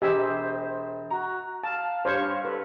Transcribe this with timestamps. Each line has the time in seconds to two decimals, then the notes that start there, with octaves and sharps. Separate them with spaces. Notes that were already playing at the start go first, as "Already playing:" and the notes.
0.02 E1 G4 C5 D#5 E5 G#5 D#6
1.10 F#4 A#5
1.64 F5 A5
2.05 G2 C5 C#5 C#6
2.45 A4 B4